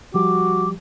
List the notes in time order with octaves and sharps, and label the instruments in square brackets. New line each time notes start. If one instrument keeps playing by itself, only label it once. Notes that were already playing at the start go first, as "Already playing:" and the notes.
[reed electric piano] F3 G3 G4 [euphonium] F#4 [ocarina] D6